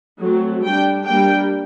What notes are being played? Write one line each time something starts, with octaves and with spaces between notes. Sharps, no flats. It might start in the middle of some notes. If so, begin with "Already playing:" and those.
F#3 A3 C4
G3 D4 G5
G3 A#3 D4 G5